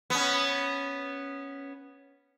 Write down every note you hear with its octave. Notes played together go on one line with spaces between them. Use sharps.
B3 C#4